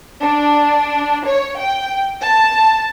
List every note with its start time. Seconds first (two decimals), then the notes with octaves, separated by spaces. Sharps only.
0.22 D4
1.25 C#5
1.59 G5
2.22 A5